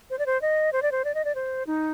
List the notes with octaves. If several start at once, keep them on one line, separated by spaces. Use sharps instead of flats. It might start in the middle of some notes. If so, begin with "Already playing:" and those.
C5
D5
C5
D#5
C5
D5
C5
D5
D#5
D5
C5
D#4